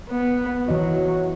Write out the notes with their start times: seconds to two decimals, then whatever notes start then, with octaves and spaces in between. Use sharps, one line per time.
0.10 B3
0.68 E3 F#3 F#4 D#5